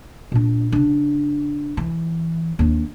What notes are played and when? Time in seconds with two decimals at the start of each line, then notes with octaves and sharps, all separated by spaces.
0.32 A#2 D4
0.72 C#3 D4
1.77 E3
2.59 D#2 D4